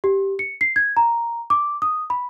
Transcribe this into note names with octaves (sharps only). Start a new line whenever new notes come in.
G4
C#7
C7
G#6
A#5
D6
D#6
B5